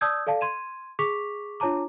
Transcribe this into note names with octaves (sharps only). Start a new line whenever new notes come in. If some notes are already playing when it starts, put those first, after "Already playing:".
D5 A5 D#6 E6 G6 G#6
A4 D5 F5 A5
C6 G#6 D#7 E7
G#4 C#6 D6 B6 F7
D4 F4 C#5 A5 A#5 D6